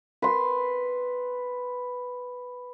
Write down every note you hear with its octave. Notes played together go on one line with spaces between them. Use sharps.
B4 C6